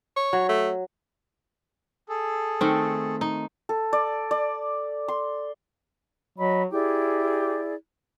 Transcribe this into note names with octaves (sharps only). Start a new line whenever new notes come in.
C#5
F#3
A3
G#4 A4
D#3 A3 C4
D#4
A4
D5
D5
C6
F#3 D#5 B5
E4 G4 G#4 D5